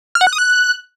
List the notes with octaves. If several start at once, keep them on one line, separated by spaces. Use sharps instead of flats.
F6
F#5
F#6
D#6
F#6